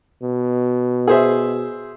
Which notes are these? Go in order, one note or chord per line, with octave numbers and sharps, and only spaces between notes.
B2
G#4 C5 E5